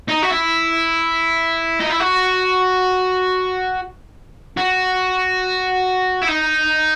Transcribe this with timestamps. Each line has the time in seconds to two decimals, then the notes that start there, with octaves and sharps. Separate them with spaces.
0.08 D#4
0.22 F#4
0.30 E4
1.80 D#4
1.90 E4
2.00 F#4
4.57 F#4
6.23 E4
6.28 D#4